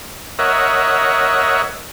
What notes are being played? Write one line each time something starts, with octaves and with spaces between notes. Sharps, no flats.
A#4 C#5 D#5 E5 F#5